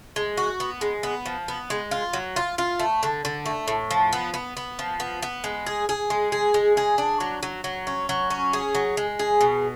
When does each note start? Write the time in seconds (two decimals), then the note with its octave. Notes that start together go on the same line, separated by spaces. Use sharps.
0.16 G#3
0.37 F#4
0.60 B3
0.81 G#3
1.03 B3
1.26 F3
1.48 B3
1.70 G#3
1.91 F4
2.13 F#3
2.36 F4
2.58 F4
2.79 A3
3.03 D3
3.25 D3
3.46 A3
3.68 A2
3.91 F3
4.13 B3
4.34 B3
4.57 B3
4.79 F3
5.00 B3
5.23 B3
5.44 G#3
5.67 G#4
5.89 G#4
6.10 G#3
6.32 G#4
6.54 G#3
6.77 G#4
6.98 D4
7.20 F#3
7.43 F#3
7.64 F#3
7.87 C#4
8.09 F#3
8.30 C#4
8.53 G#4
8.75 F#3
8.97 G#3
9.19 G#4
9.41 B2